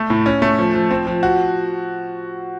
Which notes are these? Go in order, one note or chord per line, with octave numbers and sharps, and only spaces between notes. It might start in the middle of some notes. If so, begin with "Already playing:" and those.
Already playing: A3
A2
C#4
A3
F3
F3
C4
F3
F#4